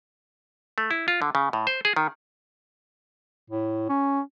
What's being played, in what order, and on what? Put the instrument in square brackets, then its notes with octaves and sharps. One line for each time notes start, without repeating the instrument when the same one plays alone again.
[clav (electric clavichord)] A3
E4
F4
D3
C#3
A2
C5
G#4
D#3
[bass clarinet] A2
C#4